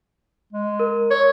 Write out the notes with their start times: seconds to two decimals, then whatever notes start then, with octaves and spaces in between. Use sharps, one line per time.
0.52 G#3
0.79 A#4
1.11 C#5 C#6